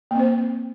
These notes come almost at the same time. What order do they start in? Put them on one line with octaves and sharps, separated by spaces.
A#3 C4 C5